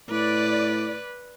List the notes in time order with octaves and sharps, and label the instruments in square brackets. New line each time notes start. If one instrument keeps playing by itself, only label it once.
[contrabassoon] A2 [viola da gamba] B4 [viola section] D5